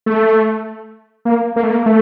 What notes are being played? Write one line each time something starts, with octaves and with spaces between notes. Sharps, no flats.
A3
A#3
A#3
A3
A#3
A3